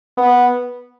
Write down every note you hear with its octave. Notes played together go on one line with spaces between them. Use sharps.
B3